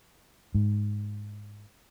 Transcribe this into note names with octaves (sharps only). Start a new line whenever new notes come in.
G#2